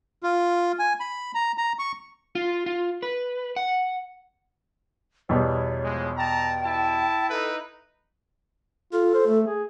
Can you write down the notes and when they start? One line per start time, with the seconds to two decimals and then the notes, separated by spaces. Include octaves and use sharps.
0.23 F4
0.79 G#5
1.00 B5
1.35 A#5
1.58 A#5
1.79 C#6
2.35 F4
2.66 F4
3.03 B4
3.56 F#5
5.29 E2 B2 G3 C#5
5.83 F3 G#3
6.17 G5 A5 A#5
6.63 E4 A5
7.30 D#4 E4 A4 B4
8.93 F4 A4
9.14 C5
9.27 A3
9.47 G#4